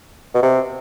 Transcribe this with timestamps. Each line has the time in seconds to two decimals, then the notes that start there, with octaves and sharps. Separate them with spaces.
0.35 B2
0.43 C3